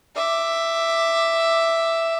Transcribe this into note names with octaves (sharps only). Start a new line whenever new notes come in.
E5 D6